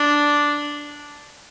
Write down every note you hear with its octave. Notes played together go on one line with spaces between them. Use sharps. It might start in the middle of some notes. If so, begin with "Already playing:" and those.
Already playing: D4